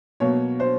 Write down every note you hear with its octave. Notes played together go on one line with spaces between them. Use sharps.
B2 F#3 A#3 C#5
C5